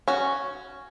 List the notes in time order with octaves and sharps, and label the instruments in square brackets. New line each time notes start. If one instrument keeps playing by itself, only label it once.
[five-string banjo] C#4 F#4